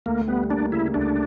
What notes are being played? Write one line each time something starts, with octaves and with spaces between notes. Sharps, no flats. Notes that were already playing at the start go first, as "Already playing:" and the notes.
D2 A#3
G3 B3
A#3 D4
C#3 E4
D2 D4